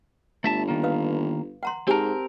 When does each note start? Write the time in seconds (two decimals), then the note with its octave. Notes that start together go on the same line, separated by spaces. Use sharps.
0.44 G1 A3 E5 A5
0.68 D#3 A#3
0.83 B4 F5 D#6
1.63 F#5 A#5 C6
1.88 G#2 C4 G4 A#4 G#5 A5